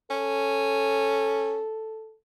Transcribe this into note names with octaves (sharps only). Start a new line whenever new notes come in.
C#4 A4